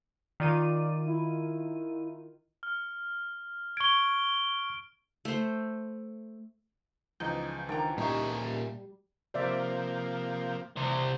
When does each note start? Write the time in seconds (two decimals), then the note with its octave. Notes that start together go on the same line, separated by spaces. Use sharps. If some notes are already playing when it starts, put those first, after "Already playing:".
0.40 D#3 F4 D5 D#7
1.07 E4
2.63 F6
3.77 C#6 G#6 D7 G7
5.25 A3 C5
7.20 C#2 E3 F3 D#4 D#5 G6
7.69 D#3 D4 G5 A#5
7.98 A#2 G3 C#4 D#4 D#5 E5
9.34 C3 F3 A#3 C5 D5 E5
10.76 C2 E3 C5